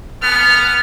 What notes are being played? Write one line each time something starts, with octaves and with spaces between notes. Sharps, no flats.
B3 F6